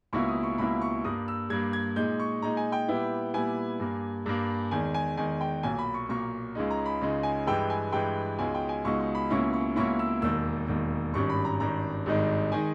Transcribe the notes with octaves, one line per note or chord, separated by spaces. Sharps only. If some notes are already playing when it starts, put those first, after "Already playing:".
C#2 B2 A#3 E4 C#6
D#6
C#6
C#2 B2 A#3 E4 B5
C#6
G2 G3 A#3 D#6
E6
G2 G3 A#3 G#6
G#6
A#2 G#3 D#4 G6
C#6
A#2 G#3 D#4 A#5
G#5
G5
A#2 G3 B3 E4
A#2 G3 B3 E4 G#5
G2 G3 A#3
G2 G3 A#3
E2 D#3 G#3 G#5
G#5
E2 D#3 G#3 G#5
G5
B1 A#2 A#3 G#5
B5
C#6
B1 A#2 A#3 C#6
C#2 C#3 G#3 D#4
A#5
B5
C#2 C#3 G#3 D#4
G#5
G2 E3 G#3 G5
G#5
G2 E3 G#3 G5
C#2 B2 G#3 D#4 G#5
G5
G#5
C#2 B2 G#3 D#4 C#6
C#6
B5
C#2 B2 A#3 C#4 E4 C#6
C#6
C#2 B2 A#3 C#4 E4 C#6
E6
E1 D#2 D#3 E6
E1 D#2 D#3
G#1 G2 D#3 G3 C#4 C#6
B5
A#5
G#1 G2 D#3 G3 C#4 A#5
G#1 G2 D#3 G#3 D#4
D#3 G#3 D#4 G#5